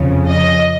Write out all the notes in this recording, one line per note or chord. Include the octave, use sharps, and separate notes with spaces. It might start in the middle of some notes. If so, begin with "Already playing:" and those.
Already playing: F2 C#3 F3
D#5